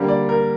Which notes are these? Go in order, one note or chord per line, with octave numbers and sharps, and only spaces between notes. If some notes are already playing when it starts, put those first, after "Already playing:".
Already playing: D3 G3 A#3
D5
A#4